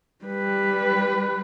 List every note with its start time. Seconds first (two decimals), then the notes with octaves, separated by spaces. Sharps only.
0.25 G3 B4